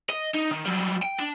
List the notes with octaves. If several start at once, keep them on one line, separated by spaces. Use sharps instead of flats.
D#5
D#4
D#3
F#3 G3
G5
D4